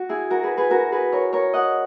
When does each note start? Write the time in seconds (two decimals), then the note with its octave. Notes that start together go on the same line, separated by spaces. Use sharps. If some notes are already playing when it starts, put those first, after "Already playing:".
Already playing: F#4
0.09 E4 G#4
0.30 F#4 A#4
0.43 G#4 B4
0.57 G#4 B4
0.71 F#4 A#4
0.92 G#4 B4
1.12 A#4 C#5
1.33 A#4 C#5
1.53 D#5 F#5